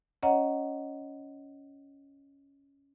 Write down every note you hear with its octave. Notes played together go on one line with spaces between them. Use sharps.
C#4 C#5 D#5 F#5 A#5